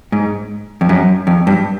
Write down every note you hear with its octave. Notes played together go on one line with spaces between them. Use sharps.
G#2
F2
F#2
F2
G2